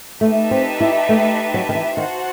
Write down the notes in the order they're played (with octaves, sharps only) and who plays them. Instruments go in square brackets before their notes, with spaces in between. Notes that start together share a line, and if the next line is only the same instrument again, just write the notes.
[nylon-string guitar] A3 [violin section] D#4 G4 B4 E5 A5
[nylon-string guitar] C4
E4
A3
F#3
D#3
E3
[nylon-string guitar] D#3 [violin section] F#4 C5 F#5 A5